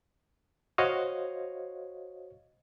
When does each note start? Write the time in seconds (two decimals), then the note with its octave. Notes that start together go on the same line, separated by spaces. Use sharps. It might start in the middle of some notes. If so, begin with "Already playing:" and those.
0.78 F#4 C5 C#5 D#5 F5